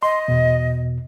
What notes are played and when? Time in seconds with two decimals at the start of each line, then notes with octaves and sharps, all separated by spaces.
0.03 D#5 C6
0.28 E2 B2